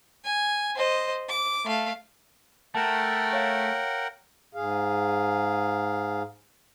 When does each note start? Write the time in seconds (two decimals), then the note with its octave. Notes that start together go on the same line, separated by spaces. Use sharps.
0.24 G#5
0.76 C5 D#5
1.29 D6
1.65 A3 F5
2.75 A3 A#4 F#5 G5 A5
3.33 C#5 F5
4.55 G#2 G#4 F5